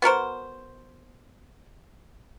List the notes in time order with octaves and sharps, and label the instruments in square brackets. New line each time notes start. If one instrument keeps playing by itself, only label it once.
[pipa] B3 F#4 A#4 C5